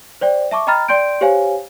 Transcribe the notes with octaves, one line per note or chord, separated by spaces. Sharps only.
C5 D5 G5
E5 A5 C#6 D6
D#5 G5 A#5 B5 F6 A6
D5 G5 C6 G6 D7
G4 C5 C#5 F5 G#5